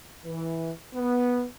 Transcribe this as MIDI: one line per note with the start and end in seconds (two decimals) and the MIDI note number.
0.24 0.70 52
0.94 1.44 59